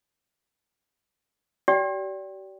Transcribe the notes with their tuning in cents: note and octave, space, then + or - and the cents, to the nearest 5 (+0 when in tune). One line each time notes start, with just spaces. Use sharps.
G4 -45 D5 -30 G5 +0